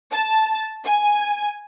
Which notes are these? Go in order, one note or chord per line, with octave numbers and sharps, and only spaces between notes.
A5
G#5